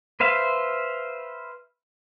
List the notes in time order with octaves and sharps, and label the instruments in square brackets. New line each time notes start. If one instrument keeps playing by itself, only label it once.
[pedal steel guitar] B4 C5 E5 F5